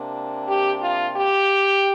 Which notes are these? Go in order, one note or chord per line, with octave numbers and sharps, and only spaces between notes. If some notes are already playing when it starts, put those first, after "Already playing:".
Already playing: C3 A#3 D4
G4
F4
G4